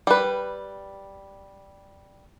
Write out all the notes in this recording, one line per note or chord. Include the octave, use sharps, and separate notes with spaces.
G3 B4